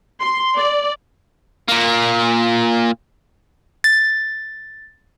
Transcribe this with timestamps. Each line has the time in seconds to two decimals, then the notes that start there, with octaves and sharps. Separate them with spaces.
0.19 C6
0.55 D5
1.68 A#2 A#3
3.84 A6